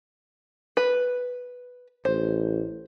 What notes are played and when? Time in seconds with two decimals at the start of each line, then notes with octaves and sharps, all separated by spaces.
0.77 B4
2.05 A1 C5